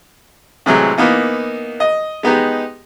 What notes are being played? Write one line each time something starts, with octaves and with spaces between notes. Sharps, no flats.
A2 C3 E3 F#3 G#3
E3 A#3 B3 D#4
D#5
G#3 B3 D#4 G4